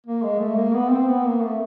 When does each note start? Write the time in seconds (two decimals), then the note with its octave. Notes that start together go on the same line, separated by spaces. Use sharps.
0.07 A#3
0.23 G#3
0.40 A3
0.57 A#3
0.73 B3
0.91 C4
1.07 B3
1.25 A#3
1.41 A3